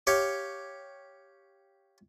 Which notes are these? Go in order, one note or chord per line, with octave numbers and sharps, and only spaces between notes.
G4 C#5 F5